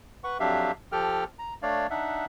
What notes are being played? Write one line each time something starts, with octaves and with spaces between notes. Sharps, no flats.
B4 F#5 C#6
F2 F#3 D4 G4 E5 F5
F3 G4 A4 G5 F6
A#5
A3 D4 C#5 D5 F5
D4 D#4 E5 F#5